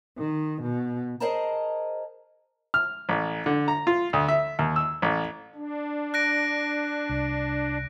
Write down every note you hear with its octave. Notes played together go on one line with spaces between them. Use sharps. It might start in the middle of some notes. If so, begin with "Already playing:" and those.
D#3
B2
G#4 A#4 C5 D#5 A5 A#5
F6
A1
D3
A#5
F4
D2
E5
D#2
E6
A1
D4
F#6 A#6 D7
C2